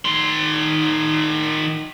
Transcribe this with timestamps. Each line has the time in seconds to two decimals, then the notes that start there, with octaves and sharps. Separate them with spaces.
0.05 D#3 C6